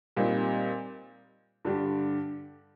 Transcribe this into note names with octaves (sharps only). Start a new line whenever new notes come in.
A#2 G3 C4 D#4
G2 D3 G3 D4 G4